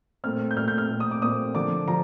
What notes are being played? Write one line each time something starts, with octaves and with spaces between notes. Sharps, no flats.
A#2 A3 C4 F6
G6
A#2 A3 C4 F6
G6
F6
A#2 A3 C4
D#6
D6
A#2 A3 C4 D#6
D3 F3 A#3 D4 D6
D3 F3 A#5